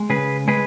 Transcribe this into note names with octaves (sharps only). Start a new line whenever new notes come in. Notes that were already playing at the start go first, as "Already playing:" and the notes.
Already playing: G#3
C#3 G#4 B4
G#3 G#4 B4